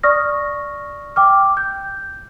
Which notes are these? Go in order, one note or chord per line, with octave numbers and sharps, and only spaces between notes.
D5 C#6 D#6 F6 A#6
G5 D6 F6
G6